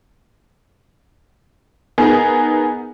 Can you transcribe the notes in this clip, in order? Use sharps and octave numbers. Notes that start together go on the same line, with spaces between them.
B3 D#4 G#4 A#4